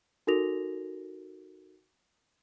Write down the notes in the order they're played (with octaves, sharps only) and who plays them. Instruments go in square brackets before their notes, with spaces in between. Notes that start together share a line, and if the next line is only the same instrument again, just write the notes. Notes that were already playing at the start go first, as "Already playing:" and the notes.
[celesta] D#4 F#4 A4 A#4 A#6 F7